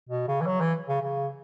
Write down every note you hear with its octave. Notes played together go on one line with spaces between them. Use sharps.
B2
C#3
E3
F#3
E3
C#3
C#3